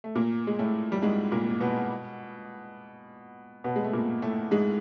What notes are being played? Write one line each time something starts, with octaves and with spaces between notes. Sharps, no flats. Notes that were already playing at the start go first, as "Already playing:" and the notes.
A3
A#2 A#3
G#3
A2 A3
G3
G#2 G#3
A#2 A#3
B2 B3
B2 B3
G#3
A3
A#2 A#3
A2 A3
G#2 G#3